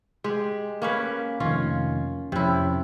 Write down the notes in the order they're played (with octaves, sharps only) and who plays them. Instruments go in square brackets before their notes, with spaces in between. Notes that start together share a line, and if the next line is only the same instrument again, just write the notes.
[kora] G#3 G4
A#3 C#4 B4
[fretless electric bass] F1 D#3 [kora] C#4 F4
[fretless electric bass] F2 C#4 [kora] C3 E4